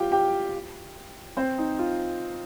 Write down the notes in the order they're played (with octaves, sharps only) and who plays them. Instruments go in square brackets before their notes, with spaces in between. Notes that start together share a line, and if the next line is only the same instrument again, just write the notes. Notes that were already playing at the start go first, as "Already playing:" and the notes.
Already playing: [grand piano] F4 G4 G5
G4 G5
C4 C5
D#4
F4